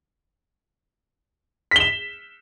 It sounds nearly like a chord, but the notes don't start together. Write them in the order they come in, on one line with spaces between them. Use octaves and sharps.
B6 G7 E7